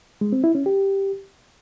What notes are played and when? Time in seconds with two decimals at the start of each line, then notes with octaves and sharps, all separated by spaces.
0.21 G#3
0.32 C4
0.44 E4
0.55 C#4
0.66 G4